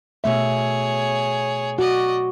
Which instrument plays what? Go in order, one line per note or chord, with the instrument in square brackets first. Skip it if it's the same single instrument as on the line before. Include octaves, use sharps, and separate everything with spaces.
[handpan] B2 A3 E5 [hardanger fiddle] G#4 C#5
[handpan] F#4 [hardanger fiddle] D5 D#5